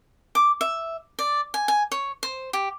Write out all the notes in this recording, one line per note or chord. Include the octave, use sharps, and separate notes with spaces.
D6
E5
D5
G#5
G#5
C#5
C5
G4